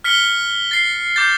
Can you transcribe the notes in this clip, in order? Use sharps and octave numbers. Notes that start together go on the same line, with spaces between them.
F6 B6 C#7 G7
A6 C7
D6 G6 A6